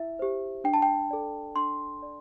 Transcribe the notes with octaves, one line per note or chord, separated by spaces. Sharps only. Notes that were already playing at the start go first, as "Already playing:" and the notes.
Already playing: E4 E5
G4 C5
D4 G5
A5
G5
A4 D5
D4 C6
D5